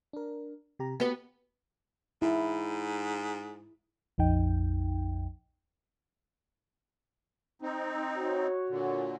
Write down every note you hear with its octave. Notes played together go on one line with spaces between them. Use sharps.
D4 A#4
C3 G4 A#5
B3 F#4 G4 B4
G#2 E4
A#1 F2 D#4 G5
C4 D#4
F#4 C#5
A#2 D3